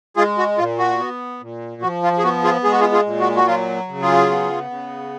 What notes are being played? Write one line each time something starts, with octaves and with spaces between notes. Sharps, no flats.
G#3 F4 G#4
F#4
A#2 F4
F#4
B3
A#2
F3 F#4
F4
G#4
B3 F#4
F4 G#4
G#3 G#4
F#4
F4 G#4
F4 G#4
A#2
F#4
F#4
F#3 F4
C#3
F4 G#4
B3
C#3